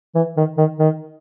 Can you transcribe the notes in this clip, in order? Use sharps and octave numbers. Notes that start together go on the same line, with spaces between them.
E3
D#3
D#3
D#3